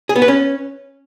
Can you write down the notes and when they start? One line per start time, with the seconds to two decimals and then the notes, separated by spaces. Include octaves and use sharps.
0.09 G#4
0.16 B3
0.22 B4
0.28 C#4